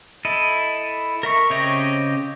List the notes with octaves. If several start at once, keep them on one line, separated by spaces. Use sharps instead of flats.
E4 A4 D#5
A#4 E5 C#6
C#3 C4 G4 C#5 D#5